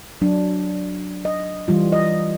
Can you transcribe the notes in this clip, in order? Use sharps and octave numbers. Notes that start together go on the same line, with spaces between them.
F#3 D4
D#5
E3 G3 F4
D#5